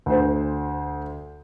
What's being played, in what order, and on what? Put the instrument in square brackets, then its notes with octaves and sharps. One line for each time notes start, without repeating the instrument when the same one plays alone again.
[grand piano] D2 C5